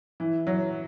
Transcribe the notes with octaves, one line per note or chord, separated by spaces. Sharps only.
E3
F#3